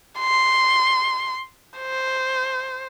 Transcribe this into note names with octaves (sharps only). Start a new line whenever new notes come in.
C6
C5